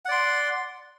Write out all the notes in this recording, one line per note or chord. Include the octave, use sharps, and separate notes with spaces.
D5 F#5 C6